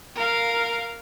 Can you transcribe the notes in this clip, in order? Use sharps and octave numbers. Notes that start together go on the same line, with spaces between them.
A#4 F5